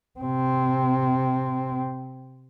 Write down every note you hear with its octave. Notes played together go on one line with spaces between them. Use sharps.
C3 C4